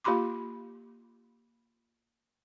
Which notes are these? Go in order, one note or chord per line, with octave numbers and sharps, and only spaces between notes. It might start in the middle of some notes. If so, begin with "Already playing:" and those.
A#3 F4 G4 B5 C6 D6